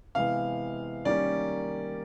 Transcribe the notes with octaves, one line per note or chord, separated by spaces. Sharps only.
C3 E3 G#3 B3 F5
D#3 G3 A#3 C#4 D5